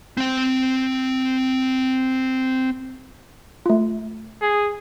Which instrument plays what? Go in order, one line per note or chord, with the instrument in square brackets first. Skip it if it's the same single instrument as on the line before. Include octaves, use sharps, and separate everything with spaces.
[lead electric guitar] C4 G5
[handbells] A3 F4
[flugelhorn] G#4